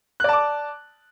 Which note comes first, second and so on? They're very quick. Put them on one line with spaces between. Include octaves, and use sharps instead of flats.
F#6 D5 A5 D6